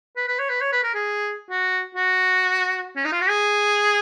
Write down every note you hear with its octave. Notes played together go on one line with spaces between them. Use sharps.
B4
B4
C#5
B4
C#5
B4
A#4
G#4
F#4
F#4
C#4
D#4
F4
F#4
G#4